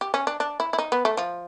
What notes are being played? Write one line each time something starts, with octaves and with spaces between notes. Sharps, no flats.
G4
C#4
D4
D4
E4
E4
D#4
B3
A3
F3